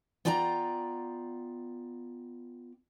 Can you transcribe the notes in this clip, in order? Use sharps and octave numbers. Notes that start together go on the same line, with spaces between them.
B3 F4 D5 G5 G#5 A#5